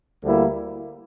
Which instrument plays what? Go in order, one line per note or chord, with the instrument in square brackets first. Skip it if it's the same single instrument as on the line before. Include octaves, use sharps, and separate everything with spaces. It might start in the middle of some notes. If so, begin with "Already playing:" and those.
[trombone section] D2 D3 G3 A#3 E4